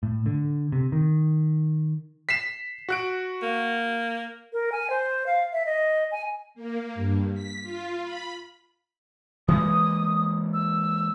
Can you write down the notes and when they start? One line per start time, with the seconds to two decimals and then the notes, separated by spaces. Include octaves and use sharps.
0.03 A2
0.26 D3
0.72 C3
0.92 D#3
2.29 B6 C7 E7
2.89 F#4 F#6 D7
3.42 A#3
4.53 A#4
4.72 G#5
4.90 C5
5.26 F5
5.53 E5
5.66 D#5
6.12 G#5
6.55 A#3
6.95 G2
7.34 B6
7.63 F4
8.03 B5
9.48 E3 G#3 A#3 D#6
10.53 E6